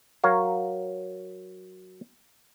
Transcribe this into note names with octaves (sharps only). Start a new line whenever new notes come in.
F#3 A#4 C#5 F5